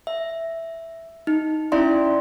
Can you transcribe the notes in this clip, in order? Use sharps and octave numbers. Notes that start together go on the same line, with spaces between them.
E5
D#4
C#4 E4 D5 E5 C6